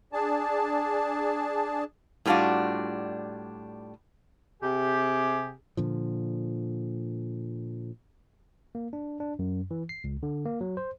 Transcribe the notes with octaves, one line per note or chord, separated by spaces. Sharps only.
D4 G#4 A5
A2 G3 C4 D4 F4 F#4
C3 G4 G#4
A#2 D3 F3
A#3
D4
D4
F#2
E3
C7
C#2
D3
A#3
F#3
C5